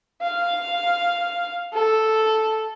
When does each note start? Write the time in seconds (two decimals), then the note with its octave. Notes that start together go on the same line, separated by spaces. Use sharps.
0.22 F5
1.73 A4